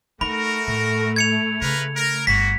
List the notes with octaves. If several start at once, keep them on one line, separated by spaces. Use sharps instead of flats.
A3 D#4 F#4 A#4 B5
A2
G#6 C#7 F7
C#3 A#4 B4
A#4
G1 A#3 F#4 B6